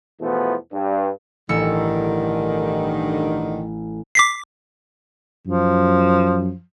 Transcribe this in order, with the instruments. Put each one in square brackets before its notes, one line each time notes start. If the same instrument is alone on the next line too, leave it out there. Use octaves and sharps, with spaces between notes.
[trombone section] E2 B2 E3 F3 A3 B3
G2
[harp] A1 E6 C#7 [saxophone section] G2 D3 D#3
[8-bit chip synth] D6 B6 C7
[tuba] F#2 [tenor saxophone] F3